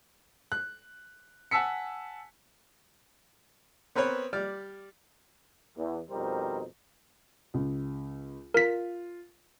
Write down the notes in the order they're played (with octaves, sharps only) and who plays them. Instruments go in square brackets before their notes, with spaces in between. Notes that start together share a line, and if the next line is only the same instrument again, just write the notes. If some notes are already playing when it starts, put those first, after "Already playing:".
[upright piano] F#6
F#5 G#5 A5 E6 B6 C#7
[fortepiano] B3 C4 A#4 B4 C#5
G3 D5 F6
[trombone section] E2
F2 B2 G3 D#4 A#4 C5
[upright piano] C#2
[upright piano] F4 [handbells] A#4 B6